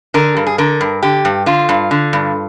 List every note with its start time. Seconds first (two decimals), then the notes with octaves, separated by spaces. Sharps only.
0.14 D3 A#4
0.37 G2
0.46 G#4
0.58 D3 A#4
0.81 G2
1.03 D3 G4
1.25 G2
1.46 D3 F4
1.69 G2
1.91 D3
2.13 G2